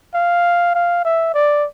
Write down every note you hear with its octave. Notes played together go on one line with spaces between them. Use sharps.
F5
F5
E5
D5